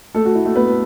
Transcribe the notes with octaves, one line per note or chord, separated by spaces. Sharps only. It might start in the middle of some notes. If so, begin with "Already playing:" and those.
A3 A4
F#4
E4
A3 A4
B3 B4